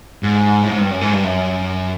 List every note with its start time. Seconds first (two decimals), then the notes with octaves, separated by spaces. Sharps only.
0.23 G#2
0.63 A2
0.71 G#2
0.81 G2
0.91 F#2
1.01 G#2
1.12 G2
1.24 F#2